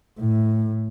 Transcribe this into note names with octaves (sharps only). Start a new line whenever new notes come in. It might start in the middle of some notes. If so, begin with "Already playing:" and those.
A2